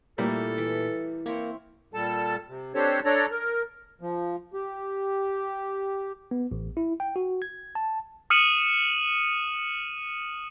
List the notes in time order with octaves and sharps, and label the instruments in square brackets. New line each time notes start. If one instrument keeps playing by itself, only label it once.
[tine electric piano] A#2 [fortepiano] G3 A3 A#3 [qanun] E4 [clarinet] A4
[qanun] E3
[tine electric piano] A#3 [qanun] C4 E4 C#5
[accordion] A#2 G3 A4 A5
C3
C4 D4 G4 A4 C5 C#5
D4 A4 C#5 D5 A#5
A#4
[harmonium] F3
G4
[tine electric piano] B3
A1
E4
G5
F#4
G#6
A5
[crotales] D#6 F6 C#7 D#7 E7 F#7